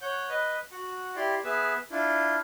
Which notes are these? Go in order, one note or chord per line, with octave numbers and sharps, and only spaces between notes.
C#5 F#5 G6
B4 D#5
F#4 F#5
E4 G4 D5 C6
B3 G#4 B4 E5
D4 E4 F4